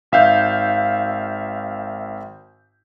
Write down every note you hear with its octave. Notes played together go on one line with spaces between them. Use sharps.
G#1 E5 F5 G6